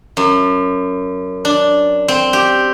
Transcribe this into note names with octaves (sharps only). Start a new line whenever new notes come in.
F#2
D4
C4
G4